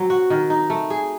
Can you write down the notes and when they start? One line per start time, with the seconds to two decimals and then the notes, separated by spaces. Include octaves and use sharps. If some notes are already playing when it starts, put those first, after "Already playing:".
Already playing: F#3 C4
0.10 F#4
0.30 D#3
0.50 D#4
0.70 A3
0.90 G#4